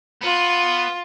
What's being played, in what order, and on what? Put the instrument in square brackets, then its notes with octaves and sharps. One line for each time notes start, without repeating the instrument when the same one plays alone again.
[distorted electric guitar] B3 [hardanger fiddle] F4